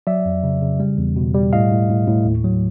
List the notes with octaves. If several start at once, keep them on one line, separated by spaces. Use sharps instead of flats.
F#3 D5 E5
F2
C#3
C#3
G3
E2
B2
G3
A2 D#5 F5
A2
A2
A2
D#2
F#3